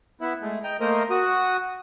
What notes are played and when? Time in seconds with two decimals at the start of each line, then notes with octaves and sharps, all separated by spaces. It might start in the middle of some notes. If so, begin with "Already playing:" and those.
0.21 B3 E4 E5
0.42 G#3 A3
0.64 D#5 G5 A#5
0.80 A3 A#3 A#4 C5 D#5
1.10 F#4 D#6